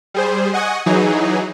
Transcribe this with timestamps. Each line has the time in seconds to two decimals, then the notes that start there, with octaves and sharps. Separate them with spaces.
0.14 G3 G#4 C5
0.53 D#5 F#5 G#5 C#6 D#6
0.86 E3 F#3 D#4 G#4